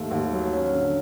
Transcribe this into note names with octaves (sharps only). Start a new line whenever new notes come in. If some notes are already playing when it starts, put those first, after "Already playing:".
Already playing: D#2 A3
D#2
F#3
C#4
D3